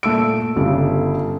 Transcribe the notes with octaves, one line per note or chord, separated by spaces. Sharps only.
A#2 A3 E6 D7
G1 C#3 G3 F4